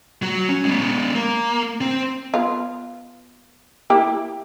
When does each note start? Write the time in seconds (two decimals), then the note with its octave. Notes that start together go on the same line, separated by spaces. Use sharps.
0.22 F#3 F#4
0.49 C#4
0.65 G#3 B3
1.15 A#3
1.81 C4
2.34 B3 F4
3.90 A#3 E4 G4